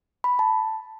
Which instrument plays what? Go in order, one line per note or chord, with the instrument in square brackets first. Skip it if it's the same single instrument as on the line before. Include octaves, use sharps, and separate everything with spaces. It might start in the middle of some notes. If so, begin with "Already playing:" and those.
[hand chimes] B5
A5